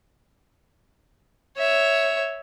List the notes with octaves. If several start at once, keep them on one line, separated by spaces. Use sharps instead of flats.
C#5 E5